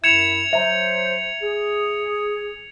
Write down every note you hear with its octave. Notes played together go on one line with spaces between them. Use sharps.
F#2 E4 E5 G#6 C#7 E7 F7
F#3 C5 E5 A#5
G#4